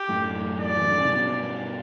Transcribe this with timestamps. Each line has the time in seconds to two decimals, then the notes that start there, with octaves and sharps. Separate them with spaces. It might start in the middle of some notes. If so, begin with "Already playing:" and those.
Already playing: G4
0.09 F#2 A2
0.59 D5
0.77 E3
0.87 D3
0.98 C#3
1.08 G2 B2